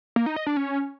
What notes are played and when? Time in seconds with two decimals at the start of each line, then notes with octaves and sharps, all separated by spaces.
0.16 A#3
0.26 D#4
0.36 D#5
0.47 D4
0.57 C#4